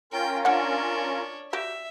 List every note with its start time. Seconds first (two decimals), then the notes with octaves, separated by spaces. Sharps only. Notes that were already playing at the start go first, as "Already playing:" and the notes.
0.12 C#4 F4 A#4 G5
0.45 A#3 D4 C#5 F#5
1.53 F#4 G4 E5 G5